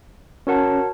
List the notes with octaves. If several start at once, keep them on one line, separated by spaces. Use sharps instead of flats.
C#4 F#4 A#4 C#5 F#5 A5